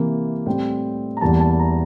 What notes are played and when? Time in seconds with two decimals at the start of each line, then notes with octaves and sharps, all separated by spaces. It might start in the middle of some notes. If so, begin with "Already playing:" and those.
Already playing: C3 E3 A#3
0.46 A2 G3 C4 G5
1.17 A#5
1.21 E2 E3 G3 A#3 A5
1.40 A5
1.60 A#5